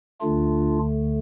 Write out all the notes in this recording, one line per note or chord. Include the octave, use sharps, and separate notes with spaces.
D2 D3 A3 D4 F4